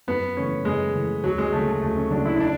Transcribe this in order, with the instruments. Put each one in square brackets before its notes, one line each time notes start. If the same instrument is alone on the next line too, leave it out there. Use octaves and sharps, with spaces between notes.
[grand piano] F#2 [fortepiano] B3
[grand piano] C#3 E3 A3 [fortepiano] C#4
[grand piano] F#2 [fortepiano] G#3
[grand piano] C#3 E3 A3
[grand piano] D2 [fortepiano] F#3
[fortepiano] G#3
[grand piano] C#3 F#3 [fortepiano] A3
[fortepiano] A3
[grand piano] D2 [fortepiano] A3
[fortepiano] C#4
[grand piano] C#3 F#3 [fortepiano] D4
[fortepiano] E4
E4
D4